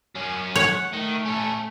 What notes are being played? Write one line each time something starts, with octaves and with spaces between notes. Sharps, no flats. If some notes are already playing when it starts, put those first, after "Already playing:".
F#2 C#4
C#5 F#5
D#3 A3
C#4 A4